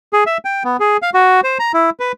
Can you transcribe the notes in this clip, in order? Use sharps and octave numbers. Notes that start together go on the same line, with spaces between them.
G#4
E5
G5
B3
G#4
F5
F#4
C5
A#5
E4
B4